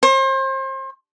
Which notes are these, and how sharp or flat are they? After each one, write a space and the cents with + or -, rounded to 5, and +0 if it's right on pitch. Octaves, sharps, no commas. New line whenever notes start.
C5 +35